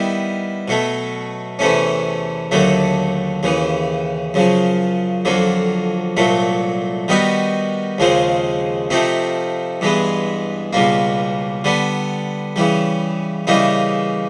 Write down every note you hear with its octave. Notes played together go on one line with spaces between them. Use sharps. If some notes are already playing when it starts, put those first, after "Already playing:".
Already playing: D#3 G3 B3 E4
B2 F#3 A3
E2 C3 E3 A3 C#4
D#2 D3 F#3 A3
D#2 C#3 E3
F#2 C#3 F3
F2 D3 F#3 A#3
C2 A#2 F#3 A3
D#3 G3 B3 D#4 F#4
D#2 C#3 F3 G#3 C4
C3 F3 A3 C4 D#4
G2 E3 G#3 B3
C#2 B2 G3 A#3
D3 G3 B3
C#3 E3 G3
C#3 E3 G3 A#3 D#4